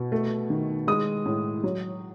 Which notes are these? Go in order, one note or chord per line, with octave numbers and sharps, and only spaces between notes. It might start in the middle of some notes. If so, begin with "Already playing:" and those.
Already playing: B2
A3
D#3
G#3 D#6
A2
F#3